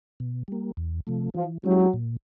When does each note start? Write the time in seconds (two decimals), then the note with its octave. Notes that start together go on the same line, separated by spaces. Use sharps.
0.20 B2
0.48 G3 A#3
0.77 E2
1.07 C3 F3 A3
1.35 E3 F3
1.64 F#3 G#3 C#4 E4 G4
1.94 A#2